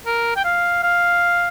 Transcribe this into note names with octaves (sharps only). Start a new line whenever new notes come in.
A#4
G5
F5
F5